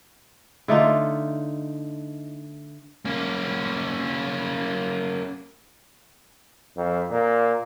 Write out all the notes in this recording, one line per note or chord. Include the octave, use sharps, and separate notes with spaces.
D3 A3 D#4 F4
A#3 C#4
F2
A#2